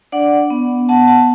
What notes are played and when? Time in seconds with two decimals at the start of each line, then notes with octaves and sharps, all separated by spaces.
0.12 D4 D5 F#5
0.50 B3
0.89 B3 F#5 A5
1.07 F#5 A5